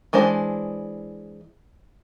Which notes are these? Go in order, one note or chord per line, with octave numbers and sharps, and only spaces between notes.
E3 G#3 D4 C5